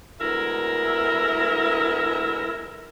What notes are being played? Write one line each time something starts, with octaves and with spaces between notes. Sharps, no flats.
D2 G#3 B3 E4 A#4 E5